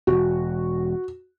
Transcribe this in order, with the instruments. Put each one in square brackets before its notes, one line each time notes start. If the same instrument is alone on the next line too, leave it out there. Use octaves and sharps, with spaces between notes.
[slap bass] E1 [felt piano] F#4